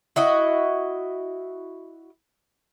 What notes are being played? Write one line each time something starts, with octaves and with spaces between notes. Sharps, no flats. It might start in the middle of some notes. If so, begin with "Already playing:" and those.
E4 F#4 D#5